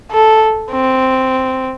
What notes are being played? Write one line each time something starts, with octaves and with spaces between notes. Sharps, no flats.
A4
C4